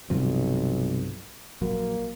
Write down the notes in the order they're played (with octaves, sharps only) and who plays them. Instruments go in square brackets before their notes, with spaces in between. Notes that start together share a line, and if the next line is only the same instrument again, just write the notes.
[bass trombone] B1 [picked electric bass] G2 C3 F3
[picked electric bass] A#1 F#3 [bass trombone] A#3